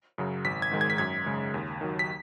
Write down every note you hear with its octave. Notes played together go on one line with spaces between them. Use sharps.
F#2 C#3 F#3
G#1 B6
G#6
G#2 D#3 G#3
G#6
B6
F#2 G#6
C#3 G#3
D#2
D#3 F#3
B6